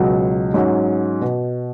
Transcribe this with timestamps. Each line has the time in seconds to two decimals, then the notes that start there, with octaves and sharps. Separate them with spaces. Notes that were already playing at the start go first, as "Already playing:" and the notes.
Already playing: C#2 B2 F#3
0.54 G#2 F#3 C#4
1.21 B2